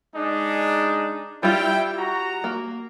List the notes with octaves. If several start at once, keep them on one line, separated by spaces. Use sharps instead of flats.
G#3 D4 D#4
G3 E4 F4 G5
F#4 A#5
A#3